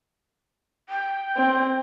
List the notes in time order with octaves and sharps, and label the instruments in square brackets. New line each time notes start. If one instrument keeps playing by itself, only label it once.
[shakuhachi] G5
[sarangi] C4